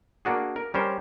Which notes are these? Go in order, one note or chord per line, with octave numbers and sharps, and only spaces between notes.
A#3 D4 F#4 G#4
A#4
G3 C#4 A#4 C5